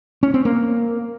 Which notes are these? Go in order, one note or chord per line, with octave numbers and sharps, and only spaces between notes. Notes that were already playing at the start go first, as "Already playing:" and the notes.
C#4
C4
A#3